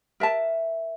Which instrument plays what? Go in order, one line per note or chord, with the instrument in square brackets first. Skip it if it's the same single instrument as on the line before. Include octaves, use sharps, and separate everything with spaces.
[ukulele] A#4 E5 A5